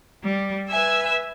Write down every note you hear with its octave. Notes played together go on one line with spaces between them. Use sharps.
G3
B4 E5 G#5 E6